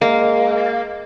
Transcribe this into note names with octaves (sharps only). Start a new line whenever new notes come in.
G#3 A#3